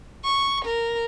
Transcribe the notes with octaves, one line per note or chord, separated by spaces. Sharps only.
C#6
A#4